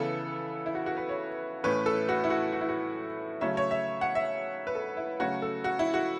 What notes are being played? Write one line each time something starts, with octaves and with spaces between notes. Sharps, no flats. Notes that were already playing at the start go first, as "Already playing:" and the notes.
Already playing: C#3 E3 B3 A4
E4
F#4
F#4
B4
C#5
A2 E3 A3 C#4 B4
A4
F#4
E4
F#4
F#4
E4
F#4
C#3 F#3 A3 C#4 E5
C#5
E5
F#5
E5
B4
A4
E4
C#3 F#3 A3 C#4 F#4
A4
F#4
E4
F#4